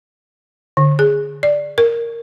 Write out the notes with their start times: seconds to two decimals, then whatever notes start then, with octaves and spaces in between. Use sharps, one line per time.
0.77 D3
0.99 G#4
1.43 D5
1.78 A#4